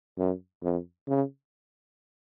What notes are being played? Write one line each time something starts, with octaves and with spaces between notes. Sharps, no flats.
F#2
F2
C#3